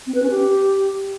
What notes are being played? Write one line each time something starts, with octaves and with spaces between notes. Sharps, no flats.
C4
B4
C#4
G4